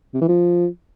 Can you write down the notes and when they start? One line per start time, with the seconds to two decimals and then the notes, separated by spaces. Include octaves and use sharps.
0.14 C3
0.21 E3
0.29 F3